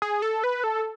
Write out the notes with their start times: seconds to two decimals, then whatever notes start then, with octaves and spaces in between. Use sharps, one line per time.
0.02 G#4
0.22 A4
0.44 B4
0.64 A4